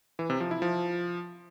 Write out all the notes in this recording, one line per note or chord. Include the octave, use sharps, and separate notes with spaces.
E3
C3
F3
E4
F3